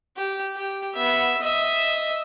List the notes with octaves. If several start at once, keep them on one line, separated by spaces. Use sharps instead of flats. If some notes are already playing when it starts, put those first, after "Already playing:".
G4
G4
B3 E5
D#5 E5